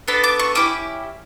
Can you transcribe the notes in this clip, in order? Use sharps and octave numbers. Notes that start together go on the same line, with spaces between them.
B3 D4 A4 B5
D6
C#6
C#4 E4 G4 D6